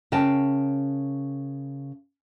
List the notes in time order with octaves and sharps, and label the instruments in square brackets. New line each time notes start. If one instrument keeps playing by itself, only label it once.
[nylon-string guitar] C#3 A#4 G5 A5